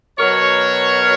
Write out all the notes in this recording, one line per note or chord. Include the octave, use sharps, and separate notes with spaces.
B2 F#3 A#4 C#5